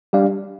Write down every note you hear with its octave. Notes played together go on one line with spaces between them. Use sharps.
G3 D4 G4 D5 F5